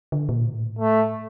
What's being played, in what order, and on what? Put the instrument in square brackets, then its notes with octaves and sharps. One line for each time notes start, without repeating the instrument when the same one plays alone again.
[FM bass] D3
A#2
A2
[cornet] A3